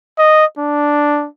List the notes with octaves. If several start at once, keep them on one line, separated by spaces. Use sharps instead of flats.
D#5
D4